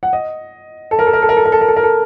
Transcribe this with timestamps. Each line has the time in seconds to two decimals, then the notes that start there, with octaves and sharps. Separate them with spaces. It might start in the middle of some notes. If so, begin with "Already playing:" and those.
0.03 F#5
0.13 D#5
0.91 A4
0.99 A#4
1.07 A4
1.13 A#4
1.22 A4
1.29 A#4
1.37 A4
1.46 A#4
1.52 A4
1.61 A#4
1.68 A4
1.76 A#4
1.83 A4